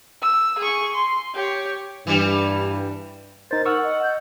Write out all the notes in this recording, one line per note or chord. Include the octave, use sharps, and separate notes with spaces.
E6
G#4 C#6
C6
G4 C#5
G2 E3 G3
D#4 A#4 C5 A6
F#5 C#6 E6 F6
D#5 F#5
G6